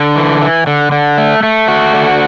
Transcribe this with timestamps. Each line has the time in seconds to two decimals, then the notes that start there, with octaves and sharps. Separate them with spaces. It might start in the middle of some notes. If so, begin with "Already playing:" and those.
Already playing: D3
0.16 E3
0.42 E3
0.67 D3
0.92 D3
1.18 A3
1.43 A3
1.68 F#4
1.94 D3